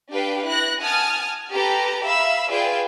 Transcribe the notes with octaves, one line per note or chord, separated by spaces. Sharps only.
D4 G4 B4 F5 G5
E4 F#6 A#6
F#5 G#5 A5 D#6 F6
G4 A4 B4 A#5
E5 F5 B5 E6
F4 G#4 B4 D5 G5